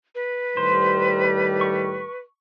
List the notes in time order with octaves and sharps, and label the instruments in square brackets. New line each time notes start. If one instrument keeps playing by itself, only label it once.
[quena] B4
[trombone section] A2 D#3 G3 [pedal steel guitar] C5
[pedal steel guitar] C#6